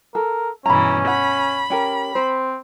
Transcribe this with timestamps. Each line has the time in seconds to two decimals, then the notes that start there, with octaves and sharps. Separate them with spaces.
0.15 A4 A#4
0.66 G2 B2 E3 C#4 A#5 B5
1.07 F#5 B5
1.70 C#4 G4 A#4
2.15 C4 C5